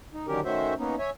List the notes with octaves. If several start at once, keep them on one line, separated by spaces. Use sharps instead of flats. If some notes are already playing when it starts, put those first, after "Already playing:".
D#4
D3 D#3 F#3 C#4 G4 A#4
D#3 A3 C#4 F#4 C5 E5
A#3 B3 C#4 D#4
C#5 E5 G#5